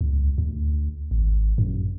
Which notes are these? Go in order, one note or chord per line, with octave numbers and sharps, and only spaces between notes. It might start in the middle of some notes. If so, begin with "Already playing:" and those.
C#2
D2
G#1
F#2